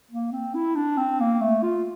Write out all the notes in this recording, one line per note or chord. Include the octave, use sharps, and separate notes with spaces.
A#3
C4
E4
D4
C4
A#3
A3
F4